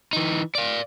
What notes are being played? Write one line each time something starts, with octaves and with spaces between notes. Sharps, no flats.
E3 D#4
D5 F5